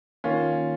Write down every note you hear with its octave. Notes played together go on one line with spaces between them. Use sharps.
D#3 A#3 C#4 F4